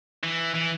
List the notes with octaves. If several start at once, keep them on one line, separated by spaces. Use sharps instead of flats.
E3
E3